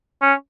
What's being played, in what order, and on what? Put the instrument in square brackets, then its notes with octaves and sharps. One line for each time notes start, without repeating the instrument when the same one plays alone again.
[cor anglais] C#4